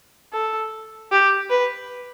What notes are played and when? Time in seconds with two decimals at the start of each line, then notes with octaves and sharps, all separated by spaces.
0.33 A4
1.12 G4
1.50 B4